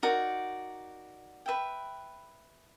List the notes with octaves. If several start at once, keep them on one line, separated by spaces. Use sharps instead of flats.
D#4 F#4 A#4 D5
B4 E5 G5